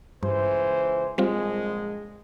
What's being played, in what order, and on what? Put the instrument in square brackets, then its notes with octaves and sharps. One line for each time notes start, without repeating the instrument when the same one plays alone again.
[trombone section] C#2 E3 C5 [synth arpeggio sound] G2
[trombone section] A#1 G#3 [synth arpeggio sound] G3 C4 F4